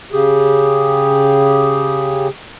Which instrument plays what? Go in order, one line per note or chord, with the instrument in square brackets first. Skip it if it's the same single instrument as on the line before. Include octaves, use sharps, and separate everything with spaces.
[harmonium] C#3 G4 G#4